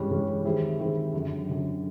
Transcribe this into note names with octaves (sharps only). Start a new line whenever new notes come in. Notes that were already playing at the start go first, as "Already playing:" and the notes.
Already playing: G2 E3 G#3 C#4
G2 E3 G#3 C#4
D#3 G3 C4 E4 G#4
D#3 G3 C4 E4 G#4
F#2 D3 F#3
F#2 D3 F#3